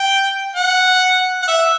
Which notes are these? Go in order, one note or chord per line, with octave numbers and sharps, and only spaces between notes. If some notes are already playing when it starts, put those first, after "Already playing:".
Already playing: G5
F#5
F#5
E5